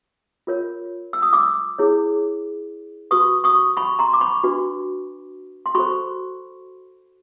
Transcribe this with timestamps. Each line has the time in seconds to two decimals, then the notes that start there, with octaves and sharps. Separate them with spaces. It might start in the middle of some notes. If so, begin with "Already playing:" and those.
0.47 F4 A#4 C#5
1.13 E6
1.22 D#6
1.33 D6 E6
1.79 E4 G#4 C#5
3.11 F#4 B4 C#6 D#6
3.44 C#6 D#6
3.77 B5 C#6
3.99 A#5 C6
4.13 D6
4.21 B5 C#6
4.44 D4 F#4 B4
5.66 C6
5.75 F#4 A4 C5 B5 C#6